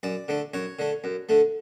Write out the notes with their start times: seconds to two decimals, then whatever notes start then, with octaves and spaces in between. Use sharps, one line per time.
0.03 F#2 D5
0.28 D3 A3
0.54 F#2 C#5
0.79 D3 A3
1.04 F#2
1.29 D3 A3